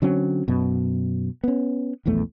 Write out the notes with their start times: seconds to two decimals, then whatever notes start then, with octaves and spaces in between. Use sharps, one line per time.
0.02 D3 F#3 C4 C#4
0.48 F#2 B2
1.44 B3 C#4
2.06 D#1 A#1 E2 A3